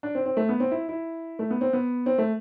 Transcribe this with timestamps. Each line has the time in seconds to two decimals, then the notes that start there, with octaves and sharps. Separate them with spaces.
0.03 D4
0.15 C4
0.26 C4
0.37 A3
0.49 B3
0.60 C4
0.71 E4
0.89 E4
1.39 A3
1.51 B3
1.61 C4
1.73 B3
2.06 C4
2.18 A3